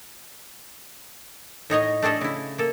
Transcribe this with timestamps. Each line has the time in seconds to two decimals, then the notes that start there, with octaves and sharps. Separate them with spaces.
1.70 A2 D#4 C#5 D#5
2.02 A3 D4 G#4 A4 D#5
2.21 C#3 E4
2.58 A#3 A4